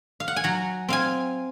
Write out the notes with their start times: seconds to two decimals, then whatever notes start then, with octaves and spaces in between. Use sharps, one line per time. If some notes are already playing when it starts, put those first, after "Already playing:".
0.20 F5
0.28 F#5
0.36 G#5
0.44 F#3 F#5 A#5
0.89 C4 F5 G#5